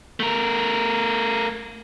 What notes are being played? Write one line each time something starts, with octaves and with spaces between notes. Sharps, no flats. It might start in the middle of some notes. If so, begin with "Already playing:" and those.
A3 A#4